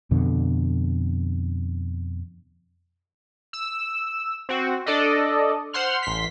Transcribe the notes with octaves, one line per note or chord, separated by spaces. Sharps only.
F2 B2 D3
E6
C4 F#4
D4 A4 D5 D#5
C5 F#5 C6 F6
A1 C6 B6